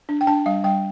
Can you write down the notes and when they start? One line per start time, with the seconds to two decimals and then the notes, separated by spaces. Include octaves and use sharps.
0.09 D4
0.21 G5
0.27 D4 A5
0.46 G3 F5
0.64 G3 G5